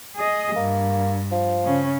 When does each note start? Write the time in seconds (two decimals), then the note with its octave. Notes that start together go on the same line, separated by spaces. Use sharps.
0.16 G#4 D#5
0.56 G2 A#3
1.32 F3
1.64 C#3 C#4